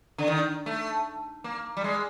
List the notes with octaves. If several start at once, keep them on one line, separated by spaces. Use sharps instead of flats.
D3
D#3
A3
A#3
G3
G#3